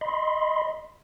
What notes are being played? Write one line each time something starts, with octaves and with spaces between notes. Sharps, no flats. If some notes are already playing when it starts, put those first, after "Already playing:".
D#5 B5 C6